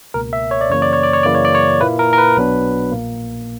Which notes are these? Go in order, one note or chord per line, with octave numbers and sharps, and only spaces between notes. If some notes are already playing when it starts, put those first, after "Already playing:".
C#2 B2 A#3 A#4
E5
C#5
D5
F#2 C#3 E3 A#3 C#5
D5
C#5
D5
C#5
F#2 C#3 E3 A#3 E4 D5
C#5
D5
C#5
A#2 A#3 E4 B4
A#4
A#4
B4
B1 B2 F#3 B3 D4
A#1 A#2 A#3